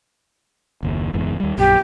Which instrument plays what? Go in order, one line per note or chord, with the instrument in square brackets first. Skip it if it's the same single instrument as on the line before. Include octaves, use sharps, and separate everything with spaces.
[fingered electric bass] F#1 D#2
F#1 E2 G#2
D#2 G3
[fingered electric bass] A#1 F#2 [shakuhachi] G4